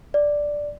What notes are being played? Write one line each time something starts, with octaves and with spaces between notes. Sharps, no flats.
D5